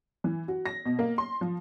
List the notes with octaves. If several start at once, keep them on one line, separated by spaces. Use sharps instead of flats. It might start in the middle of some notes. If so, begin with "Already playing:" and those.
E3
F#4
A#6
B2
A#3
C6
F3